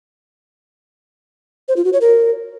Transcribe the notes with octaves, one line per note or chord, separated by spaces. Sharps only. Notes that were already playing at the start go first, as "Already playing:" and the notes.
C5
F4
F#4
C#5
A#4